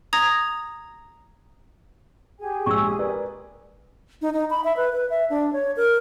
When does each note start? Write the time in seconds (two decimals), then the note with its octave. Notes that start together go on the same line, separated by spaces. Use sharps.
0.13 A#5 D#6 G#6 A#6
2.39 G4 G#4 G#5
2.66 A#1 G#3 C#6 E6
2.99 A#4 B4 D5
4.22 D#4
4.33 D#4
4.50 B5
4.64 E5
4.77 B4
4.93 B4
5.10 E5
5.30 D4
5.53 C#5
5.77 A#4